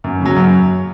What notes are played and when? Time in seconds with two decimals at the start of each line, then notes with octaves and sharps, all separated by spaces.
0.04 F#2
0.21 C#3 F#3
0.36 F#2